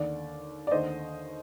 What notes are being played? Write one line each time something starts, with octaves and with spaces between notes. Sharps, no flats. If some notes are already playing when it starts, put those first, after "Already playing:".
Already playing: D#2 D3 D5
D5
D#2 D3 C5 D#5